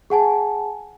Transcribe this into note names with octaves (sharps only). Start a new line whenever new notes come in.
G#4 F#5 G#5 A5